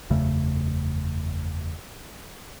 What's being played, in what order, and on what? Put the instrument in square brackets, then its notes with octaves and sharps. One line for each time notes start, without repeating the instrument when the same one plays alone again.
[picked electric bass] F#1 E2 C#3 A3